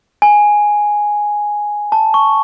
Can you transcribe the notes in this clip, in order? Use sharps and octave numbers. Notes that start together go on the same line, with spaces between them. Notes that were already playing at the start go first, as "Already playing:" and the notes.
G#5
A5
C#6